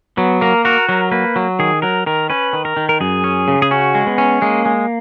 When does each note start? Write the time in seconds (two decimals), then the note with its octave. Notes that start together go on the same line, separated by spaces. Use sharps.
0.17 F#3 B3
0.41 A#3 A#4
0.65 F#4 A#4
0.89 F#3 A#4
1.12 A#3 B4
1.36 F#3
1.59 D#3 G#4
1.82 F#3 A#4
2.06 D#3 A#4
2.30 C#4 B4
2.53 D#3
2.65 A#4
2.77 D#3
2.89 A#4
3.01 F#2 G#4
3.24 C#4
3.48 C#3
3.62 G#4
3.71 C#4 F#4
3.95 G#3
4.07 B3
4.18 C#4
4.42 G#3 A#3
4.66 G#3